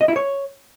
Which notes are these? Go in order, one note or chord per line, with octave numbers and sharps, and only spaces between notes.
D#5
E4
C#5